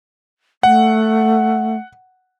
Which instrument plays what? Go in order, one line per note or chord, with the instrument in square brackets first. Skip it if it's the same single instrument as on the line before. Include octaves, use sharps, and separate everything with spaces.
[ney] A3 [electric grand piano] F#5